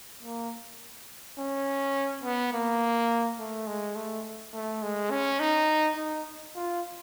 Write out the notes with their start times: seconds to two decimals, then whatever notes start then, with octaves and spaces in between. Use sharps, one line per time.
0.23 A#3
1.38 C#4
2.24 B3
2.53 A#3
3.39 A3
3.67 G#3
3.95 A3
4.53 A3
4.82 G#3
5.11 C#4
5.40 D#4
5.97 D#4
6.55 F4